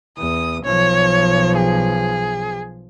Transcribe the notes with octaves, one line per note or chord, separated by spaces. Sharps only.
E2 D#6
B1 F3 C#5
G#4